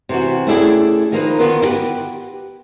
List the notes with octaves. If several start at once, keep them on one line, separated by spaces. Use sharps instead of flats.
C3 E3 F#4
A3 C#4 D4 E4 G4 G#4
D#3 F3 A#3 D4 D#4 B4
D3 D#3 B3 D#4 F4 B4
E4 F#4 G4 B4